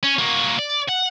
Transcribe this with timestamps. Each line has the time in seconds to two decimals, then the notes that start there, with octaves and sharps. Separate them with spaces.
0.03 C#4
0.19 A#3 F#4
0.59 D5
0.89 F#5